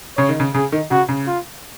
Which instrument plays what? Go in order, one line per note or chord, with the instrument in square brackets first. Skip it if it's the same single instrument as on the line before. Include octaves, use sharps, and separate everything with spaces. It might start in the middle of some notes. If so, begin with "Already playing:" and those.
[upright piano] C#3 [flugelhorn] C#5
[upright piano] D#3
C#3
[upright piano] C#3 [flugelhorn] G#4
[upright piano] D#3
[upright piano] C#3 [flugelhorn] F#4
[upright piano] C#3
[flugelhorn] F4